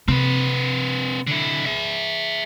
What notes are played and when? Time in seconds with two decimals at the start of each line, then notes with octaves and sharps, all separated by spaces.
0.08 C3 C4 B4
1.27 D3 E4
1.66 G#4 E5